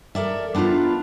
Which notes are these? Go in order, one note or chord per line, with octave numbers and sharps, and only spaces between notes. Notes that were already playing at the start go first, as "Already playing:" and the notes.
A4 A#4 D5 E5
B3 D4 D#4 F4 B4